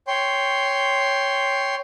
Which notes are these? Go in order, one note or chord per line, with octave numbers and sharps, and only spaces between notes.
C#5 G5 C6